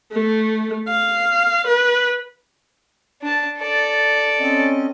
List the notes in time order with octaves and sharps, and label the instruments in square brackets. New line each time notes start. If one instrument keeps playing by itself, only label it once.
[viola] A3
F5
B4
[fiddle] D4 A5
A4 D5
[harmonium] C4 C#4 D#5